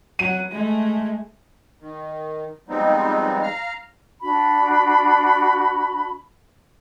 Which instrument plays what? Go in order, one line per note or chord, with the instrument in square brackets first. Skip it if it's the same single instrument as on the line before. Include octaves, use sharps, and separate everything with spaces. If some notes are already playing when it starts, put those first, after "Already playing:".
[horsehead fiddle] F#3 F#5 [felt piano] D#7
[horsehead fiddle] G#3 A3
[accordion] D#3
F3 G3 G#3 B3 C4 D#4
F5 A#5 F6
[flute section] D4 F#4 B5